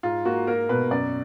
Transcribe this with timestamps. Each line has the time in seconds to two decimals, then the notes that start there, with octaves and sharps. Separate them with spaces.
0.03 G#2 F4
0.25 A#3 F#4
0.47 A#3 A#4
0.69 B2 B4
0.91 F#2 D5